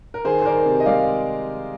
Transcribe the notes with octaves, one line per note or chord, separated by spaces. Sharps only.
A#4
D#3 G#4 C5
C5
D#3 A#4 D5
C3
D#5
G#3 D5 F5